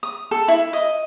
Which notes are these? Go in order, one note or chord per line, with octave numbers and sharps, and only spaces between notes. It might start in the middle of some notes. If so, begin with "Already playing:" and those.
D#6
A4
E4
D#5